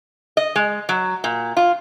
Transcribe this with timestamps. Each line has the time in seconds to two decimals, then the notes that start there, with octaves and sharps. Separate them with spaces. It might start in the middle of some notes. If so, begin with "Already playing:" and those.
0.37 D#5
0.56 G#3
0.89 F#3
1.24 A#2
1.57 F4